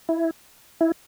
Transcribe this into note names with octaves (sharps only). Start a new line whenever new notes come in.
E4
E4